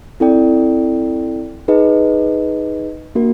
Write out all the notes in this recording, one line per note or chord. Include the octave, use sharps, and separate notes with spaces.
C4 E4 A4 D5 G5
D#4 G#4 B4 D#5
A#3 D4 F#4 A#4